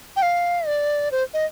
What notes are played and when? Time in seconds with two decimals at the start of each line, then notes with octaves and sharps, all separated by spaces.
0.16 G5
0.22 F5
0.67 D5
1.12 C5
1.34 D#5